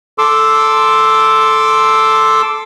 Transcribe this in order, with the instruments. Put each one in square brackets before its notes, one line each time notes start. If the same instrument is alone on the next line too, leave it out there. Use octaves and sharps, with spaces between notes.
[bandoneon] A4 C6 D6 E6